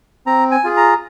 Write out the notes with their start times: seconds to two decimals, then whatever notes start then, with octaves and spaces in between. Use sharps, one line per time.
0.26 C4 A#5
0.51 G#5
0.64 F4 G#4
0.77 A#5